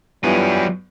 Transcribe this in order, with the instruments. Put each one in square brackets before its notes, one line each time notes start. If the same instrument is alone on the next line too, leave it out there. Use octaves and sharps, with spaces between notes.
[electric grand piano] G2 B3 E4 [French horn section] E3 G3 F4 [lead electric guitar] F#3 G#5